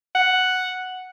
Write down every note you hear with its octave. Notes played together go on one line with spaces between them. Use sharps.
F#5